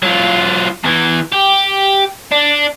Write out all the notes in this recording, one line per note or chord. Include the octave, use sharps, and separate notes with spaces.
F#3 F4
E2 E3
G4
D4